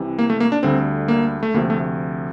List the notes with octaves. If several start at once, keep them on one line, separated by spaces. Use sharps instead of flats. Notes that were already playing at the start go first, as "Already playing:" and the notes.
Already playing: C2 C3 E3
A#3
A3
A#3
D4
D2 D3 G3 C4
A#3
A3
D2 C3 F3 A#3
A3